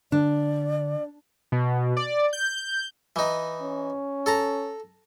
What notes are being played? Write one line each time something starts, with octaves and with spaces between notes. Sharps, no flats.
D3 D4 D5
B2
D5
G6
E3 D#4
C#4
A4 A5 A#5